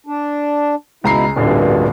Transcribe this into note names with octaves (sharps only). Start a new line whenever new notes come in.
D4
C#2 B2 E4 A#5 C7
D1 A1 G2 A#2 D3